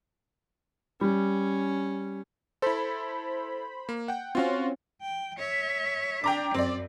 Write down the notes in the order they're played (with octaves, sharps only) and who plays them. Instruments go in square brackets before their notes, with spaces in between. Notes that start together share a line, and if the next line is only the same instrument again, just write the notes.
[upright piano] G3 [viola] C#4
[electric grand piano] E4 A4 [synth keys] C5 B5
[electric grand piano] A#3
F#5 G5
[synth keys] C4 C#4 [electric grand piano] F4 F#4 F5
[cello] G5
C#5 E5
[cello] D4 [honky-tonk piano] G5 A#5 D6
[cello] F#2 [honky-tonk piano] C4 D5